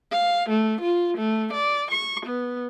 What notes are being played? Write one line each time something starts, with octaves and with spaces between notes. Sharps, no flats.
F5
A3
F4
A3
D5
C#6
B3